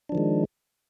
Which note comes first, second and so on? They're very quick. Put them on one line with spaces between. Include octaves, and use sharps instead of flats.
D4 F3 D#3 G#3